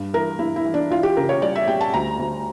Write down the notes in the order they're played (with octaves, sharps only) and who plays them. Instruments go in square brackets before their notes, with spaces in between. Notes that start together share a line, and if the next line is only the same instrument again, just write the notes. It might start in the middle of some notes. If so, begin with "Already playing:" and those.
Already playing: [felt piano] G2
E3 A#4
G2 E4
E4
E3
D4
E3 F4
G4
C#3 A#4
C#5
G3 D5
E5
G3 G5
A5
D2 A#5
D2